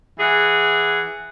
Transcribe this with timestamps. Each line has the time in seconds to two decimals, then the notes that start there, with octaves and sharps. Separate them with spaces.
0.19 E3 G#4 F#5